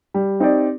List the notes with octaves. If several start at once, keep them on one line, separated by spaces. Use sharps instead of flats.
G3
C4 D#4 G4 D5